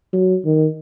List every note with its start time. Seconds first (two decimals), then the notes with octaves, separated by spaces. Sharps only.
0.13 F#3
0.45 D#3